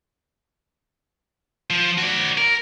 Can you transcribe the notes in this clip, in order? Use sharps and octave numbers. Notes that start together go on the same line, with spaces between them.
F3
F#4 D5
A#4